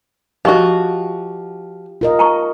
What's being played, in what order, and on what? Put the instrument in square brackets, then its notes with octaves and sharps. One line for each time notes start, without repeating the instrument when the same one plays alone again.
[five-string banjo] F3 F#4 [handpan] G4 [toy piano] D#5 C#6
[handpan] F4 A#4 D#5
[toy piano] A5 A#5 C#6